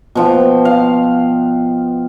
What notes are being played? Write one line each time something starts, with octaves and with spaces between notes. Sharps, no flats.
B2 F3 G5
F5